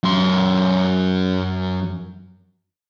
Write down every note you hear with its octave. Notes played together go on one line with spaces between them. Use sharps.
F#2 C6